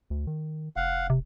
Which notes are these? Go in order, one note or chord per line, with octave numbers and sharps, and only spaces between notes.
D2
D#3
F1 F5 F#5
C3